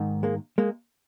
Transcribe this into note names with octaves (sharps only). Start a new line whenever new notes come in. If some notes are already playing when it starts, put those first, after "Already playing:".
Already playing: G#2 D#3
G#3 A#3
G#3 A#3